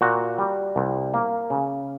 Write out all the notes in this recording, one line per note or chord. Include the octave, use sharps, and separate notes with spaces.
A#2 F#4
G3
C2
A#3
C#3